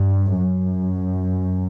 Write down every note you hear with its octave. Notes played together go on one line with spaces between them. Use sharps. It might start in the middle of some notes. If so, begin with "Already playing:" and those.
Already playing: G2
F#2